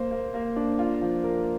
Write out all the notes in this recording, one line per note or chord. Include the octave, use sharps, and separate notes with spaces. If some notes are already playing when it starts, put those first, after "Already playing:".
Already playing: A#3 C5
A#3
A#3
D4
F4
F3
A#4